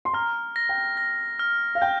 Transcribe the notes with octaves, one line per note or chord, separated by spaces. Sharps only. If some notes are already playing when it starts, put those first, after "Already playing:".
C6
A#5 F6
A#6
G5
A#6
F6
F5
G5 G6